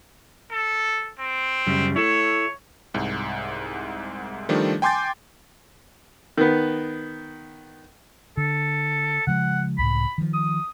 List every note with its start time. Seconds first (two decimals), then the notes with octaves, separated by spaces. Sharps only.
0.51 A4
1.19 C4
1.67 F#2 C#3 G3
1.96 E4 A4 C#5
2.94 C2 G#2
4.49 D#3 F3 G3 A3 D4
4.82 G5 G#5 C6 D6 G6 A6
6.38 D#3 B3
8.37 D3 A4
9.27 C#3 F3 G#3 F#5
9.78 C#2 A2 B5
10.18 D#3 F3
10.33 D#6